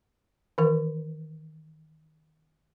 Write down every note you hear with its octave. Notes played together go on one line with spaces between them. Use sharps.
D#3 E3 A#4